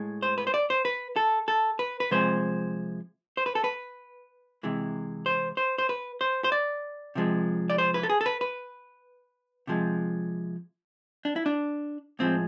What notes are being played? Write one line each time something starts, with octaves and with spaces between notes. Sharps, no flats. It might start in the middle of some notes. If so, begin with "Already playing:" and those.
Already playing: A2 G#3
C5
B4
C5
D5
C5
B4
A4
A4
B4
B4
C3 F3 G#3 C5
C5
B4
A4
B4
C3 E3 G#3
C5
C5
C5
B4
C5
C5
D5
C3 F3 G#3
D5
C5
B4
A4
G#4
A4
B4
B4
C3 F3 G#3
D4
E4
D4
A2 F3 G#3 C4